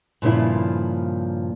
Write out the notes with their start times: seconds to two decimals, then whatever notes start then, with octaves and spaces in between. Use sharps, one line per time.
0.22 G2 A#2 C#3 F3 E4